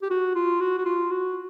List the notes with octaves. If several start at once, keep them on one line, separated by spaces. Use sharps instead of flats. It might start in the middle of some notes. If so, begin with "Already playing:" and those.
G4
F#4
F4
F#4
F#4
F4
F#4